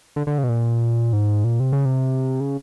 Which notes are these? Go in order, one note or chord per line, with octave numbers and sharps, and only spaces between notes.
D3
D3
C#3
B2
A#2
G#2
A#2
C3
C#3
C3
C#3